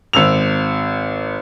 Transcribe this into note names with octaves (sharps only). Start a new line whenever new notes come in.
G#1 E6 F7